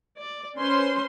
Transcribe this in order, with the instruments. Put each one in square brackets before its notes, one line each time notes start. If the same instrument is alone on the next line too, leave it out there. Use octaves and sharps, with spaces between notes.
[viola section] D5
C#4 B4 C5 C6